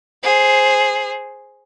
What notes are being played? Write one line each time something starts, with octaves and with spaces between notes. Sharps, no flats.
G#4 C5